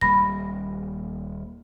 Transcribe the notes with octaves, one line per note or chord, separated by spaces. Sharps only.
D#1 G3 A#3 B5 A#6